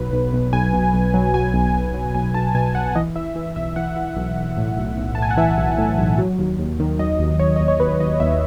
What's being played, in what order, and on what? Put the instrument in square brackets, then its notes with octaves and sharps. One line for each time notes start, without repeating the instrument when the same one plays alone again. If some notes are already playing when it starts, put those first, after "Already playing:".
Already playing: [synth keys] B1 F#3 B4
B1
B1
B1 G#5
B2
B1
F#3
F#3 G#5
B1
B1 G#5
F#3
B1 G#5
B1 A5
B2 G#5
B1 F#5
E3 D#5
E3 E5
E3
B1 E5
E3 F#5
E3
B1
B1
A2
B1
B1
A2 A5
G#5
F#5
E3 E5
B1
A2
B1
F#3
D#2
D#2
D#3
F#3 D#5
D#2
D#2 C#5
D#2 D#5
C#5
D#2 B4
D#2 D#5
D#2 E5